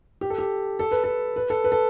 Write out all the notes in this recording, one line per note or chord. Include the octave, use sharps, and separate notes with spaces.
G4
A4
G4
A4
B4
A4
B4
A4
B4
A4